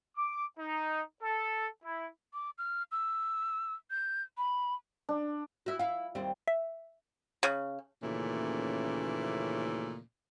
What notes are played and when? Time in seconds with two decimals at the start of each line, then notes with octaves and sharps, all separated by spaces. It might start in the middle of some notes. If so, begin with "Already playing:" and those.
0.17 D6
0.58 D#4
1.22 A4
1.84 E4
2.34 D6
2.58 F6
2.92 E6
3.90 G6
4.37 B5
5.09 D4
5.66 E4 F#4
5.79 E4 F5
6.15 D#2 G3 C4
6.48 E5
7.43 C#3
8.02 D#2 A#2 C#3 E3 A3 C#4